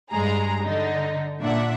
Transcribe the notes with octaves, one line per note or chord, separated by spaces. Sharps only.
G2 G#3 G#4 A#5
D3 D#4
A#2 D4 E5 F#5